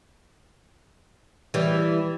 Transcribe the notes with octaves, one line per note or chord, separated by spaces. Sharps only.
E3 G3